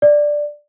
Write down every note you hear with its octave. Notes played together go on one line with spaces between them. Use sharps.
D5